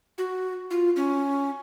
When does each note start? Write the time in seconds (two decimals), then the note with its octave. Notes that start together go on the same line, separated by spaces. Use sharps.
0.18 F#4
0.71 F4
0.96 C#4